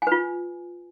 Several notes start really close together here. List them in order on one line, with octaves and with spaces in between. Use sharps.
G#5 B4 F4